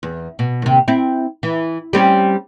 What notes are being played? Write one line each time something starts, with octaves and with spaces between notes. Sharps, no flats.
E2
B2
D#2 C3
C4 E4
E3
G3 C4 C#4